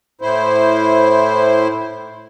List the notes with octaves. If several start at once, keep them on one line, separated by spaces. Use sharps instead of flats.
A2 E4 C5